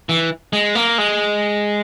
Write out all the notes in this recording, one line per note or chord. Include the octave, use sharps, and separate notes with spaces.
E3
G#3
A#3
G#3